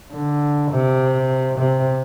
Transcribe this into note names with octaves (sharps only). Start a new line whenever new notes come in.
D3
C3
C3